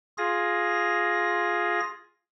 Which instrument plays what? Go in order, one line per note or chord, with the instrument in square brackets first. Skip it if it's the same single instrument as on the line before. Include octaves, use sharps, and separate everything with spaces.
[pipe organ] F4 G#4 A#6